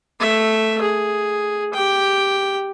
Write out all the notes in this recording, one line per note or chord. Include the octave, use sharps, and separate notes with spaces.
A3 E5
G#4
G4 G5